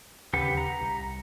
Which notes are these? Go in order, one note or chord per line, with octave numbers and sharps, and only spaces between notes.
D1 D#2 C#3 G4 B4 F#5
A#5
C2